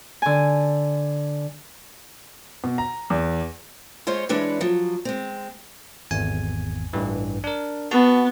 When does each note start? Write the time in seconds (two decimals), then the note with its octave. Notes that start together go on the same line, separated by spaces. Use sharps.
0.22 D3 G#5
2.64 B2
2.78 A#5
3.10 E2
4.07 G#3 F4 C5 C#5
4.29 E3 G#3 D4 E4 B4 C#5
4.61 F3 F#3
5.05 G#3 C4
6.11 G#1 E2 G#5
6.93 A1 G2 E3
7.44 D4 A#4
7.91 B3 F#4 A5